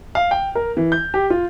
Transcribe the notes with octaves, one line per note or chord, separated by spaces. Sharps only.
F5
G5
A#4
E3
G6
G4
F4